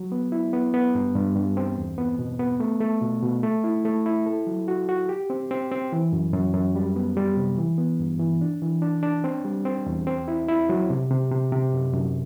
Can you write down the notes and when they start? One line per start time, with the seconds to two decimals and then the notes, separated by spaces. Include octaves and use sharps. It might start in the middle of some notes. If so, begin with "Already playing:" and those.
Already playing: F#3
0.12 B3
0.32 E4
0.53 B3
0.74 B3
0.95 G2
1.16 G2
1.36 G2
1.57 C4
1.78 E2
1.98 B3
2.19 B2
2.39 B3
2.60 A3
2.81 A3
3.02 B2
3.23 B2
3.43 A3
3.64 E4
3.85 A3
4.06 E4
4.26 A4
4.47 F#3
4.68 F#4
4.89 F#4
5.09 G4
5.30 C4
5.51 C4
5.72 C4
5.92 E3
6.13 F#2
6.33 F#2
6.54 F#2
6.75 G3
6.96 B3
7.17 G3
7.37 C3
7.58 E3
7.78 B3
8.00 G2
8.20 E3
8.41 D4
8.62 E3
8.82 D4
9.03 D4
9.24 C4
9.45 G3
9.65 C4
9.86 E2
10.07 C4
10.28 E4
10.48 E4
10.69 F#3
10.90 C3
11.10 C3
11.31 C3
11.52 C3
11.73 F#2
11.93 F#2